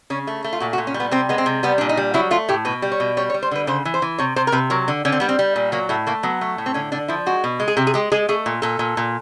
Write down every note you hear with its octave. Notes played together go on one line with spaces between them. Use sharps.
C#3 C#4
A3
A3
F4
A#2 F#4
F#4
A#2
C#4
G3
B3
C3 C4
G#3 B3
C4
C3
G3 B3
A#2 D4
D#4
G3
F#3 E4
A3 F4
A2 G4
B2 B4
G3
C#5
B2
G3 C#5
C#5
G3
C5
D3 B4
C#3 C5
E3
C5
E3
C3 C#5
C3 C5
A#4
C3 B4
F#3 A#4
D3
D3 C#4
C4
G3 B3
C4
G3
A#2
F#3 A#3
A2 A3
A3 A#3
F#3 B3
A3
A2
C4
D3 C#4
D3 D4
F3 E4
G#3 F#4
B2
G#3
G#4
C3 G4
G#4
G#3 G4
G#3 G#4
A3 G#4
A#2
A#2 A4
A#2
A#2